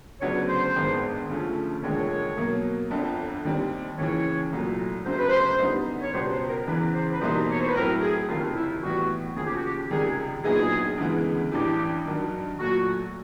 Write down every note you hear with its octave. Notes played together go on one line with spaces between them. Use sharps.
D2 C#3 F#3 B3 D4 C#5
C5
G#1 G2 D#3 G#3 B3
D2 C#3 F3 A3 C#4
E1 D#2 D3 F3 G#3 C#5
B2 F#3 A#3
G1 F2 D3
D#2 D#3 G3 C4
D#2 C#3 E3 C#5
C2 A#2 F#3 A3
G1 F#2 C#3 F#3 A3 C5
B4
C5
F#2 D3 G3 B3 D#4
C#5
C#2 B2 G3 B3 C5
C5
A#4
E2 C#3 E3 B4
C5
B4
E2 B2 G3 A#3 D#4 C5
C#5
C5
B4
A2 F#3 A3 C4 E4 A#4
G#4
F#1 F2 C3 D#3 F4
E4
A2 E3 G3 B3 E4 F#4
D#2 C#3 F3 G#4
G4
F#4
G4
C#2 C3 D#3 G3 G#4
A#1 A#2 F#3 B3 D#4 G#4
D2 C#3 E3 G#3 B3
A1 G2 E3 G4
G2 D#3 F#3
A#2 F#3 A3 F#4